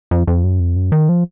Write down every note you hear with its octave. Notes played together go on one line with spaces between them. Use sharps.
F2
F2
F#2
F2
F#2
D#3
F3